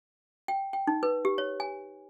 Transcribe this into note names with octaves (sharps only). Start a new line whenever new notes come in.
G5
G5
D#4
B4
G4
C#5
G#5